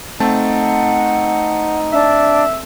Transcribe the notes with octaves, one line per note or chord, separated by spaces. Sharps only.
A3 C4 D#4 F#5 A5
D4 E5